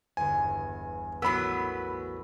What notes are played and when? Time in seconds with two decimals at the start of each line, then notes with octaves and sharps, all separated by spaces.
0.17 G1 E2 G#5
1.22 A1 F#3 B3 A#4 B5 E6